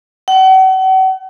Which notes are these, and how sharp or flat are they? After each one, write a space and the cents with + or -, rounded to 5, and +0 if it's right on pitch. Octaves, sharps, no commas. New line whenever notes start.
F#5 +40